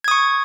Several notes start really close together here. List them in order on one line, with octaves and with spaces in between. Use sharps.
G#6 D#6 C#6